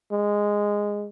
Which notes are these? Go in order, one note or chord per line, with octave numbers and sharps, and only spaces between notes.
G#3